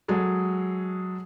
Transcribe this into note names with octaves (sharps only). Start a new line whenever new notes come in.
F#3 G#3 G#4 A4